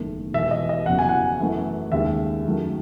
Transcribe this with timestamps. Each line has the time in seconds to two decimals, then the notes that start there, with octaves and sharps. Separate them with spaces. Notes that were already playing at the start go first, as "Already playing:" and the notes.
Already playing: F#1 E2 D#3 A3
0.33 E1 E2 B2 E5
0.51 D#5
0.69 D#5
0.86 F#1 E2 C#3 F#3 F#5
0.99 G#5
1.09 F#5
1.40 F#2 E3 A3
1.92 D#2 C#3 G#3 E5
2.44 F#2 D#3 F#3 A3